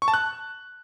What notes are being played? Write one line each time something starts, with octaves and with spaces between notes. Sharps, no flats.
C#6
A5
F#6